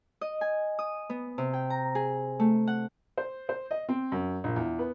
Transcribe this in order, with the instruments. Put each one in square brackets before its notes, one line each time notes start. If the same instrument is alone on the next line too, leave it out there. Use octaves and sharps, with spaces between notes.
[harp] D#5
G#5
D#6
B3
C3
G5
A#5
G#4
A3
F#5
[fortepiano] C5
C5
D#5
C4
F#2
A#1
E2
B3